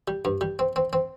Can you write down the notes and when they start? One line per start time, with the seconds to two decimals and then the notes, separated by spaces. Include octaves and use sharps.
0.08 G3
0.25 G2
0.41 G3
0.59 C4
0.76 C4
0.93 C4